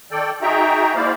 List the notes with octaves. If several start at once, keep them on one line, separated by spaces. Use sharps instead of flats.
D#3 A4 D5 G5
D#4 F#4 G#4 E5 G5 A#5
G#3 A#3 E4 C5 D5 F5